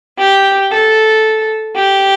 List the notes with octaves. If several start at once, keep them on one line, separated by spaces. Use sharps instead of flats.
G4
A4
G4